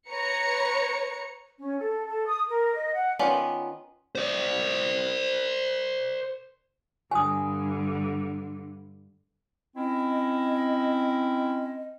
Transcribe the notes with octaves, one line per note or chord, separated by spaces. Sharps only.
B4 C#5 A#5 C#7
C#4
A4
A4
D#6
A#4
D#5
F#5
D#3 B3 C#4 F4 D5
C5 D5
G2 D3 G#5 D#6
C4 C#4 E4 D#5